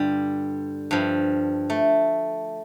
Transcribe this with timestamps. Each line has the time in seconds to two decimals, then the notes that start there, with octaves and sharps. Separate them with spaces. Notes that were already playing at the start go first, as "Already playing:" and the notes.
Already playing: G2 D3 G3 F4
0.91 G2 F3
1.70 A3